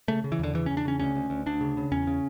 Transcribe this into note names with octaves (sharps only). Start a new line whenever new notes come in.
C#3 A3
C#3
E3
E2 D3
C#3 E3
E2 C#4
D4
C#3 C#4
D2 C#4
D2
D2
D2 D4
C#3
C#3
E2 C#4
C#3